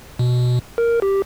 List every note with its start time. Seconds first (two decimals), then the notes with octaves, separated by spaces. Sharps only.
0.19 B2
0.78 A#4
1.02 G4